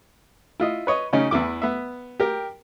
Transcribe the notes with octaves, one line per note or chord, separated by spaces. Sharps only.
E4 F4 D#5
B4 C#5 D#5
C#3 C#4 D#4
E2 E3 E4 D6
B3 E5
G4 A#4 G5